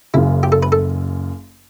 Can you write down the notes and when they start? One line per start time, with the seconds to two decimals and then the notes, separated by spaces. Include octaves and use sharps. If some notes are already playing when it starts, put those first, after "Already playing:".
0.14 F#1 F#2 C#3 E4
0.43 G4
0.52 A4
0.63 B4
0.72 A4